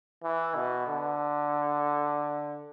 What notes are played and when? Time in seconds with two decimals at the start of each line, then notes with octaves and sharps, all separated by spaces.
0.23 E3
0.55 B2
0.88 D3